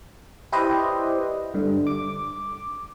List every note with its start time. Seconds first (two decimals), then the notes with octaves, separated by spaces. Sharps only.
0.53 E4 G4 B4 C5 D5 D#5
1.54 G2 D3
1.87 D6